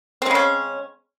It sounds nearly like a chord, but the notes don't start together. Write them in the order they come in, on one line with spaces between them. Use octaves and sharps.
C4 G#3 C#3 C#4